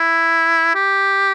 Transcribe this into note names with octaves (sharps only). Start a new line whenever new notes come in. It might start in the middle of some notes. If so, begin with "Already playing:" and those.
Already playing: E4
G4